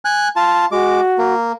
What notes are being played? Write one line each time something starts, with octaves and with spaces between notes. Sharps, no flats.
G#5 F#6
F4 A5
G#3 F#4 D6
A#3